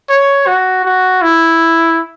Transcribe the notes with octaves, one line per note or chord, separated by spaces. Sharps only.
C#5
F#4
F#4
E4